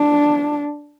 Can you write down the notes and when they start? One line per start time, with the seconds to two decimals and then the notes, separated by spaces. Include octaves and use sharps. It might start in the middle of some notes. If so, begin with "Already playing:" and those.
Already playing: D4